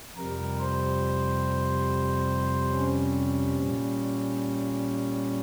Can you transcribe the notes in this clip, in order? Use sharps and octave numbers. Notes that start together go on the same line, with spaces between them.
F2 C3 G3 A#4
C5
C#4
A#2 G3